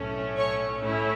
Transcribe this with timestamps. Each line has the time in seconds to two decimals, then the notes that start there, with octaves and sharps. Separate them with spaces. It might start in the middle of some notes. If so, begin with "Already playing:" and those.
Already playing: B1 A2 A3 C#4
0.37 C#5 C#6
0.82 A2 A3 C#4 E4